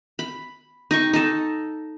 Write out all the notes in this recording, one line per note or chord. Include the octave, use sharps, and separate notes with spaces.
B5
D#4 G5 C#6
D#4 A4